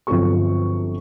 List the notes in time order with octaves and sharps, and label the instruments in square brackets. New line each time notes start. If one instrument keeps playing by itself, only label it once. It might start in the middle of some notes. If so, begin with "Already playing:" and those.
[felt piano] G1 F3 F#3 C4 A4 C#6